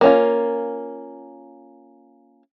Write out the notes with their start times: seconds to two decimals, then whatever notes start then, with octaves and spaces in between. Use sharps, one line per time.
0.01 A#3 C#4 F4